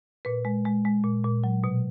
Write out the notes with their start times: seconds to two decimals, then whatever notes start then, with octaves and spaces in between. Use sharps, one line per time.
0.25 A#2 B4
0.45 G#3
0.65 G#3
0.85 G#3
1.04 A#2
1.24 A#2
1.44 F#3
1.64 B2